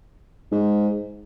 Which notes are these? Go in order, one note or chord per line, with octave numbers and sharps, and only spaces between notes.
G#2